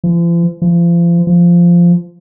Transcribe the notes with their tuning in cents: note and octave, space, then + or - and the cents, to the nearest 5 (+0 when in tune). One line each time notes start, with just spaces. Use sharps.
F3 -45
F3 -35
F3 -10